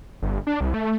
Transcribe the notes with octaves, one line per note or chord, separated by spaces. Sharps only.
G1
D4
C2
A3